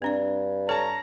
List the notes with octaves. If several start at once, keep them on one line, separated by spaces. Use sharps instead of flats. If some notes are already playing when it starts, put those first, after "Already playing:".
G2 C4 D4 D5
A4 C#5 A5 A#5 C#6